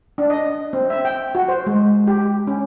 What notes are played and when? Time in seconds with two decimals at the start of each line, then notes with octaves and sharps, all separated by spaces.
0.18 D4
0.30 D#5
0.73 C4
0.90 E5
1.05 G5
1.35 F#4
1.48 C5
1.67 G#3
2.07 G4
2.47 C#4